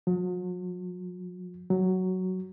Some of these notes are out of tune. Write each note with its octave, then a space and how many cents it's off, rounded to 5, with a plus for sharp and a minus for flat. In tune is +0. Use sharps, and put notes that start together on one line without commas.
F#3 -45
F#3 +5